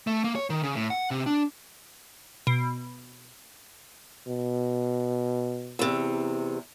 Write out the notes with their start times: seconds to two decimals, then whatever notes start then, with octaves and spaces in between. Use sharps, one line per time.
0.07 A3
0.24 A#3
0.35 C#5
0.50 D#3
0.63 C#3
0.75 A2
0.90 F#5
1.11 C3
1.26 D4
2.47 B2
4.27 B2
5.79 E2 C3